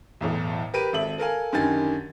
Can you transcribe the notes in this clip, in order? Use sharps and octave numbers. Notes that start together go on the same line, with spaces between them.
B1 E2 A2
G4 A#4 B4 D7 D#7
G#1 A4 E5 F#7
A4 A#4 F5 G#5
F#2 D3 D#3 G4 G#5 A6